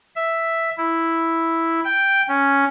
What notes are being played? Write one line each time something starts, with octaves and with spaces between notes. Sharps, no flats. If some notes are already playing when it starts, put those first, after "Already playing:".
E5
E4
G5
C#4